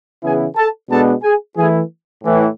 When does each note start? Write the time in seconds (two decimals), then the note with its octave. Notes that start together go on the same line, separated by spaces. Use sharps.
0.23 C#3 E3 B3 E4 G#4 G#5
0.56 A4 A5
0.90 B2 G#3 B3 D4 A4 A5
1.23 G#4 G#5
1.57 E3 A3 E4 G#4 G#5
2.24 A2 E3